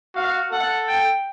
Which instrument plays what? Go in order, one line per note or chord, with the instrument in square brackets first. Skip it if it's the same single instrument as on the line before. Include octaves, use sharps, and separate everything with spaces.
[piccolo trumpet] F#4 [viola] F5
[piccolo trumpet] A4 [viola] F#5
[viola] G5